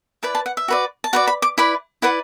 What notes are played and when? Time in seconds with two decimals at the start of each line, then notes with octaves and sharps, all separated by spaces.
0.23 E4 B4 D5 A5
0.35 A5
0.46 F#5
0.57 E5
0.68 F#4 B4 D5
1.04 A5
1.13 F#4 B4 D5 F#5
1.27 B5
1.42 D6
1.58 E4 B4 D5 B5
2.02 E4 B4 D5 F#5